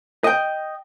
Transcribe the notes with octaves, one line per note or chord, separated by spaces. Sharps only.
D#5 G5